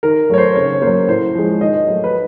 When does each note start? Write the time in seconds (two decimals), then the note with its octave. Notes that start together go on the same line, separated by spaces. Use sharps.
0.03 D#3 A#4
0.29 F#3 A3 C#5
0.38 C5
0.56 C#3 C#5
0.82 F#3 A#3 C5
1.08 A2 C5
1.35 F3 G#3
1.61 D#3 D#5
1.87 F#3 A3
2.04 B4